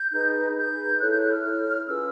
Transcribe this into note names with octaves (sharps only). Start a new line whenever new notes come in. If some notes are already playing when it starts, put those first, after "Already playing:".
Already playing: G6
D#4 G#4 B4
D#4 G#4 B4 G6
E4 A4 C#5 F#6
G6
F#6
F6
E4 A4 C#5
C#4 F4 G#4 B4 E6